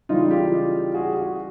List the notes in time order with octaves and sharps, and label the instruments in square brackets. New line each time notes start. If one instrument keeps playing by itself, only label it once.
[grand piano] C#3 E3 G3 D#4 F4
F4 G4
F#4 G#4
F#4 G#4